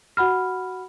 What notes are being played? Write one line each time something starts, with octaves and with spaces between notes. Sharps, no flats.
F#4 F#5 B5 F6